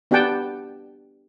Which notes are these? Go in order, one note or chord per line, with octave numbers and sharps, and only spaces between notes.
B3 D4 G4 F#5 G5 A5